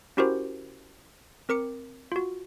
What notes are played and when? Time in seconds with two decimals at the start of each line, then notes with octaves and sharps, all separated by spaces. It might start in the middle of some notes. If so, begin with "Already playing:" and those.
0.17 C#4 E4 F#4 G4 A#4 C5
1.49 C4 A#4 D6 C#7
2.12 F4 F#4